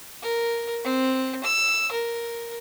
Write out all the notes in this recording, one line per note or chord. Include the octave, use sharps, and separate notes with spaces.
A#4
C4
E6
A#4